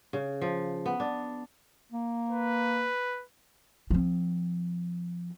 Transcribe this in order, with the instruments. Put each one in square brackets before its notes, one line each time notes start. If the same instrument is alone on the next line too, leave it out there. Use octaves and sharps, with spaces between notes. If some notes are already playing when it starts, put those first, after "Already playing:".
[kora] C#3
F3
B3
D4
[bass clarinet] A#3
[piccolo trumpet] B4
[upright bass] F3 C4